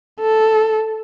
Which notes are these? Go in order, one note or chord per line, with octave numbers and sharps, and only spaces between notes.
A4